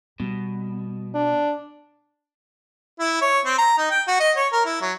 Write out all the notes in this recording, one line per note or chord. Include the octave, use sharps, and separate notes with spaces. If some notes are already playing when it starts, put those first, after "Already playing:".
B2 G3
D4
E4
C#5
C4
A#5
D#4
G5
F#4
D#5
C#5
A#4
E4
F#3